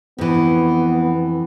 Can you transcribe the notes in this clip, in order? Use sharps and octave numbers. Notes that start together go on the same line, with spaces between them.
F2 E3 B3